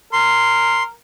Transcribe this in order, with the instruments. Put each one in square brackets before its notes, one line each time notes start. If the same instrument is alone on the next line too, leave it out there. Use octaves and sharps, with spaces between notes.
[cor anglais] A#4 [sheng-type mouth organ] C6